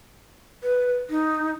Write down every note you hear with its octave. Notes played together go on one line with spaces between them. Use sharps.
B4
D#4